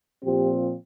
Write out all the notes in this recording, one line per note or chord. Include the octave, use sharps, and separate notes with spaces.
A#2 F3 C4 G4